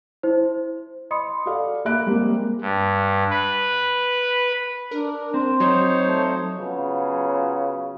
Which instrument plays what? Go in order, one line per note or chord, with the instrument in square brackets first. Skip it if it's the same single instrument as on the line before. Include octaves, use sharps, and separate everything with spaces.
[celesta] E4 C5
D#5 B5 C6 D#6 C#7
[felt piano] F#4 A4 D5 F5
A#3 A#4 E5 B5 F#6 D7
G3 G#3 A#3 C4
[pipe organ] G2
B4
[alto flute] D4 [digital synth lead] A#4
[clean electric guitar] C4 [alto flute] C6
[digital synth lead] F#3 [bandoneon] D#4 C5 C#5
[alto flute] A3
[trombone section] C#3 F#3 B3 F4